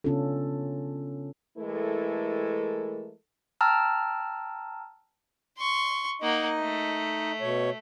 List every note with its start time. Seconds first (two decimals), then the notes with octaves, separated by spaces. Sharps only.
0.04 C#3 B3 C#4 D4 F4 A4
1.58 E3 G#3 A3 E4 A4 A#4
3.61 G5 A5 A#5 E6 F6
5.58 C6 C#6
6.22 A#3 D#4 D#5 F#5
6.60 A3
7.41 B2 C#5